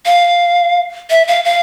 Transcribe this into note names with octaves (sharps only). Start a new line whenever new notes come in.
F5
E5
F5
F5